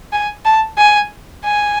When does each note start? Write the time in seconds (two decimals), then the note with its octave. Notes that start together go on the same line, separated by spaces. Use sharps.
0.12 G#5
0.45 A5
0.78 G#5
1.44 G#5